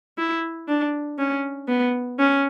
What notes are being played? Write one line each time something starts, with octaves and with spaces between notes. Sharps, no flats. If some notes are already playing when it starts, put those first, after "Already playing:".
E4
D4
C#4
B3
C#4